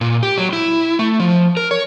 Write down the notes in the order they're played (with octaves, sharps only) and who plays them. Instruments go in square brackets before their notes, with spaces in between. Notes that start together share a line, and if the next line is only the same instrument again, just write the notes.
[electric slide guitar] A#2
G4
F#3
E4
A3
F3
A#4
C#5